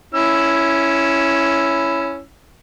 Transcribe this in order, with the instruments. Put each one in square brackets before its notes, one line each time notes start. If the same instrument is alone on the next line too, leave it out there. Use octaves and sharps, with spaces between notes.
[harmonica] C#4 E4 E6